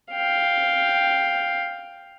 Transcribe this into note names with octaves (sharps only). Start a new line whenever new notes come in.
F5 G5